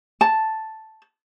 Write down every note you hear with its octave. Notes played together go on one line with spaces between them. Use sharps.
A5